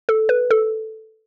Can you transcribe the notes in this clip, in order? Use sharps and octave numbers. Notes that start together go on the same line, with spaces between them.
A4
B4
A4